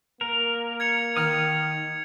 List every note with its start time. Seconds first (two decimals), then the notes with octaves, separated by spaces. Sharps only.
0.21 A#3 A#4
0.80 G#6 C#7 F7
1.17 D#3 D#6 F6